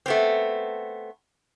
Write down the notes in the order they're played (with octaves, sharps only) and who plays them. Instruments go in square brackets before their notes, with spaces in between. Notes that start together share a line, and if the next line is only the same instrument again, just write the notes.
[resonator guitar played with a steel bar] A3 B3 C4